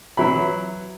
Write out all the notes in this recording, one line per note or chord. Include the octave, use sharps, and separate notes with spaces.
E3 F#3 E4 B5